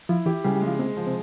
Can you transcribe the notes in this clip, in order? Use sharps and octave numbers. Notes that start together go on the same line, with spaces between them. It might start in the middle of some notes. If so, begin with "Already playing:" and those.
F3 E4
E3 G4
C#3 G3
G3
G#3
F3
C3 G#3
F3
C3